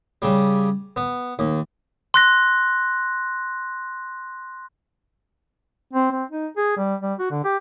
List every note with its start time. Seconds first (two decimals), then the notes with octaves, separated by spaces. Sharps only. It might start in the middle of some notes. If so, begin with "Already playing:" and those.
0.22 C#3 G3
0.96 B3
1.39 D#2
2.14 C6 F#6 A#6
5.93 C4
6.12 C4
6.31 D#4
6.57 G#4
6.77 G3
7.02 G3
7.19 F#4
7.31 D3
7.44 G4